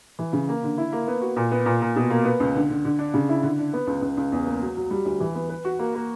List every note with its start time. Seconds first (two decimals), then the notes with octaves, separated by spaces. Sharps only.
0.19 E3
0.33 C#3
0.48 A#3
0.63 D3
0.78 E4
0.92 A#3
1.08 B3
1.22 F#4
1.36 A#2
1.51 B3
1.66 A#2
1.81 A#2
1.96 B2
2.10 A#3
2.25 B3
2.40 C#2
2.55 D3
2.70 D3
2.85 D3
2.99 D4
3.14 C#3
3.29 E4
3.43 D3
3.59 D4
3.73 B3
3.87 C#2
4.02 C#2
4.17 C#2
4.32 E2
4.46 A#3
4.62 F#3
4.77 F#3
4.91 G3
5.05 D2
5.21 E3
5.35 B3
5.49 B4
5.65 F#4
5.79 A#3
5.95 A#3